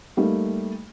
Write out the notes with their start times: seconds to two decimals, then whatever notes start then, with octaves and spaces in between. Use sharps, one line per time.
0.17 G3 A3 A#3 D#4